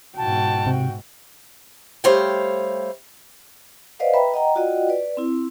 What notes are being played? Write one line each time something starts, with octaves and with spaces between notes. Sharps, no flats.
G#2 B2 F#4 G5 A5
C3
G3 A3 C5 C#5 F5 G5
B4 C5 D5 D#5 F5 F#5
B4 E5 G5 A#5 B5
D#5 F#5 G5 A#5
F4 F#4 D5 D#5 F#5 G5
B4 D5
C4 E4